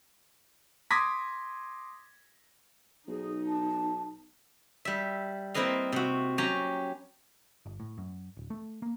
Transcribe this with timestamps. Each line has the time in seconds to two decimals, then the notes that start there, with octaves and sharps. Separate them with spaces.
0.91 C6 D6 D#6 G#6 A#6 B6
3.08 B1 D#4 G#4
3.47 A5
4.85 G3 E5
5.54 A#3 C4 E4 B4 D#5 F5
5.92 C3 F#4
6.38 F#3 C#4 G4 A#5
7.66 G1
7.80 A2
7.98 F#2
8.37 D1
8.50 A3
8.82 A#3